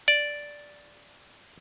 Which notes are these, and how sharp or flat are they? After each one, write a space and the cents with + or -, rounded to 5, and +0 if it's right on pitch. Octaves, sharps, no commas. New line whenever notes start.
D5 -5